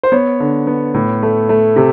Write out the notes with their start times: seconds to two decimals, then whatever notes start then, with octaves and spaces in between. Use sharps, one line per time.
0.03 C5
0.12 B3 C#5
0.40 D3
0.67 B3
0.94 A2
1.23 A3
1.49 A3
1.76 C3